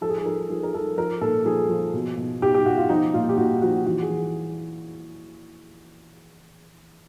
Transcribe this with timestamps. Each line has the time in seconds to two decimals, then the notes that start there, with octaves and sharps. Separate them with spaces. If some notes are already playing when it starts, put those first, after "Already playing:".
0.01 F3 A4
0.09 G#4
0.17 A4
0.26 F3 A#4
0.50 F3 G#4
0.63 A#4
0.74 F3 A4
0.97 F3 A#4
1.21 A#2 A4
1.45 F3 G#4
1.69 F3
1.94 B2
2.17 B2
2.42 B2 G4
2.54 G4
2.66 B2 F#4
2.77 F4
2.89 F3 D#4
3.14 A#2 F4
3.29 G4
3.38 A#2 F#4
3.62 F3 F#4
3.86 E3 F#4
4.02 G#4
4.10 E3